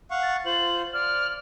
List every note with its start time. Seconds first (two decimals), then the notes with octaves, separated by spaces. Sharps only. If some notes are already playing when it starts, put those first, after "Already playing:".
0.11 F5 F#5 C#6
0.23 A6
0.46 F4 C5 F#7
0.94 D5 F6